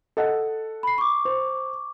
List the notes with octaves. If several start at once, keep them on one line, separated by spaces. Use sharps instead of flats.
A4 D#5 F#5
B5 C7
C#6 D6
C5